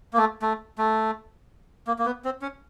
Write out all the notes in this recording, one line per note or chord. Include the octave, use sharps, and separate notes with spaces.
A#3
A3
A3
A3
A#3
A#3
B3
C4
C#4